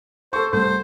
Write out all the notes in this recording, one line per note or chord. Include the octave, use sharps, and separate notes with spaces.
A4 C5 C#6
C2 A3 C5